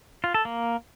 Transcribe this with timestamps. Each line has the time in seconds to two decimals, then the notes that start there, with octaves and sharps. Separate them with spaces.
0.24 F4
0.34 A4
0.45 A#3